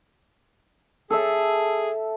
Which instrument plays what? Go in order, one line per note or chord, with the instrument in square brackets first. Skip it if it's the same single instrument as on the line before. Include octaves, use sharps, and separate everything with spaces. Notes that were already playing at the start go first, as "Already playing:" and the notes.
[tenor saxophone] G#4 [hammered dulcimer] A4 E5